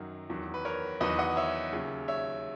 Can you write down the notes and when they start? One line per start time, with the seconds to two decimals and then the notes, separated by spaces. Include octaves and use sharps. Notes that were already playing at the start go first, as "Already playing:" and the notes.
Already playing: F#2 D#3 F#3
0.30 E2 D#3 F#3
0.54 B4
0.65 A#4 C#5
1.00 E2 D#3 F#3 B4 D#5
1.19 D#5 F#5
1.37 C#5 E5
1.72 D#2 C#3 F#3
2.08 C#5 E5